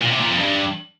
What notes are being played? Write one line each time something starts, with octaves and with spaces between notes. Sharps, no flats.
A#2
C3
A#2
F2
G2